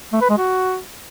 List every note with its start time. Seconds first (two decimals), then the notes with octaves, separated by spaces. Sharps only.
0.13 A3
0.21 B4
0.30 G#3
0.38 F#4